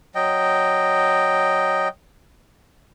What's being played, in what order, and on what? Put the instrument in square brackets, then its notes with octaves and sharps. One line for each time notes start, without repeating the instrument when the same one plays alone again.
[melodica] F#3 D#5 G5